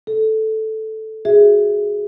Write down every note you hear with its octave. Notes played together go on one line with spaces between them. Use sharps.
A4
F#4 G#4 E5